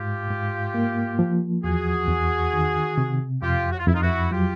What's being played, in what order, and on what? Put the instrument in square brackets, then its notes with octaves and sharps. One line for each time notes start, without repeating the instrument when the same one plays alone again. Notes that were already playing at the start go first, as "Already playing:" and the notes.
Already playing: [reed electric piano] G#2 [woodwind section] F4 G4
[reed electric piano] G#2
A#3
F3
[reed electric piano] E2 [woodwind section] F#4 G#4
[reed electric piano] E2
D#3
C3
[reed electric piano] F2 [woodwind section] F4 G4
[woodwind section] F#4
F4
[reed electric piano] F2 [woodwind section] E4
[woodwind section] D#4 F4
E4 F#4
[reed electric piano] F#3 [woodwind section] F4 G4